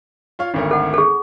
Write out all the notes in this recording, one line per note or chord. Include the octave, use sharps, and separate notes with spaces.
F4 C#5 F5
G#1 D2 A#4
A4 F#5
G#4 A4